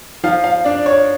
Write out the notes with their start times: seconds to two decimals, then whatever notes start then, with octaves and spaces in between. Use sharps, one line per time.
0.24 F3 F5
0.44 F5
0.64 D4 D5
0.86 C#5